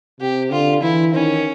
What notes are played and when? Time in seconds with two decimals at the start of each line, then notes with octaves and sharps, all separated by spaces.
0.20 C3 G4
0.51 D3 F4
0.82 E3 E4
1.12 D#3 C#4